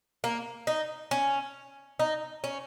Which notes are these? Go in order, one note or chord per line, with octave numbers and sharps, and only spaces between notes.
A#3
D#4
C#4
D#4
C#4